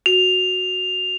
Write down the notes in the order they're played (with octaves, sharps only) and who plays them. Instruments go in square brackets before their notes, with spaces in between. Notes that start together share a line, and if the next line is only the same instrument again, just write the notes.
[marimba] F#4 [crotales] F7